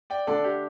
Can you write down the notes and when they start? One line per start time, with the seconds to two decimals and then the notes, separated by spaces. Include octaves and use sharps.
0.10 D5 G5
0.27 D3 A3 D4 A4 D5
0.44 G4